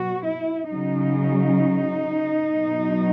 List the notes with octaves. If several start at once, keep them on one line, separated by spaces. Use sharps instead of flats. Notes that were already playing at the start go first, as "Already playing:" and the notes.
Already playing: B2 F#3 F#4
E4
C#3 F#3 D#4
B2 F#3